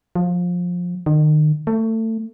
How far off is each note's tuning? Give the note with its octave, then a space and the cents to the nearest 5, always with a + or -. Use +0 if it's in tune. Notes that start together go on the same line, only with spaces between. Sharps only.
F3 +20
D#3 -35
A3 +25